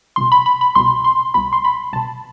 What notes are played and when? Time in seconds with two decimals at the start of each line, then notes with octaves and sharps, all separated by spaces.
0.16 C2 B2 C6
0.32 B5
0.46 B5
0.61 B5
0.75 C2 B2 C6
1.04 C6
1.34 C2 B2 B5
1.53 C6
1.65 B5
1.93 C2 B2 A5